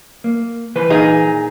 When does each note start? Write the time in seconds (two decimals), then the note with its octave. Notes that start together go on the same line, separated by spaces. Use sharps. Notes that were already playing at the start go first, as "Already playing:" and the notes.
0.24 A#3
0.76 E3 B4 C5
0.90 A#2 D#4 G#4